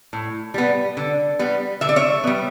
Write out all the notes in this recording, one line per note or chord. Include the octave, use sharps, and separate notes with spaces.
A2
G3 B3
D3
G3 B3
D3 E5
D5
C#5 E5
G3 B3